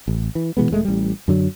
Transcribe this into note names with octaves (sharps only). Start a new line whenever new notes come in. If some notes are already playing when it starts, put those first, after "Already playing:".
A1
E3
B2 E3 G#3 B3
E1 G#3 A3
A1 G3
F#2 D3 F#3